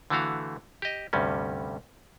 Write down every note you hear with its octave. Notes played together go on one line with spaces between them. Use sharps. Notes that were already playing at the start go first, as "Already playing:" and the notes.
D3 E3 A3 F#4 F5
G4 D#5
D2 G2 C3 G3 C#4